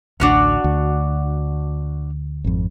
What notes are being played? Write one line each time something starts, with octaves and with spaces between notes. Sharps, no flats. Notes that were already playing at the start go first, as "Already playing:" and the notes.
A1 D2 D4 F#4 C#5
D2
G#1 F2